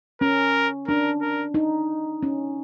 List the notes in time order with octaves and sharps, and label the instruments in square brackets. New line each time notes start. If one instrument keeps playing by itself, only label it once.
[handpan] C#4 [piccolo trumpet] A#4
[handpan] D4 [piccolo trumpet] A#4
[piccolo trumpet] A#4
[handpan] D#4
C#4